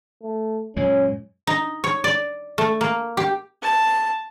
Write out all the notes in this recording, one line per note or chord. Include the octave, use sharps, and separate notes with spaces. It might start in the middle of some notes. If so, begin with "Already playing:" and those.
A3
F#2 A#2 G#3 C#4
D#4
C#5
D5
A3
A#3
G4
A5